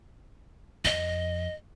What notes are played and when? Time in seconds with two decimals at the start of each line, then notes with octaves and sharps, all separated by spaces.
0.85 F2 D#5